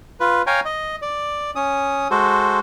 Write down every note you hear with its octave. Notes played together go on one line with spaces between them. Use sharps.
F4 B4
C#5 F5 G5 G#5 A#5
D#5
D5
C#4 D#6
G#3 F#4 A4 C5